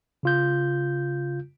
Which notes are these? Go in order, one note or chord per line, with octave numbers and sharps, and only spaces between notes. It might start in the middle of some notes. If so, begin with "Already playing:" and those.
C#3 F4 G6